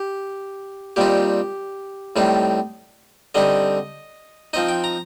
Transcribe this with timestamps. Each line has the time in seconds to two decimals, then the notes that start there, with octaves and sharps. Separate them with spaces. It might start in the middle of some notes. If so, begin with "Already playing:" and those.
Already playing: G4
0.96 A#2 G3 C4 D#4 G4
2.16 A2 G3 C4 D#4
3.35 D3 G3 C4 D#4 D#5
4.53 F3 C4 D#4 D#5
4.68 G5
4.84 A#5